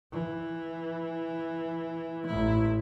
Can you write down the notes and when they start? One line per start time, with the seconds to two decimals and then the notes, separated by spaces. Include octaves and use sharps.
0.12 E3
2.26 A1 E4